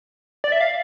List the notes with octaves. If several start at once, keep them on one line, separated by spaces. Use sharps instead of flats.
D5
E5
F5